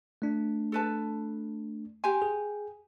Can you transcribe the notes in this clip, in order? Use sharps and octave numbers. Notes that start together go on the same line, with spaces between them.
A3 D4
A4 B4 A5
G4 G#5 C6
G#4